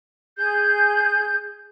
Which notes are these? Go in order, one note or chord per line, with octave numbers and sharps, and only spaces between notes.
G#4 G6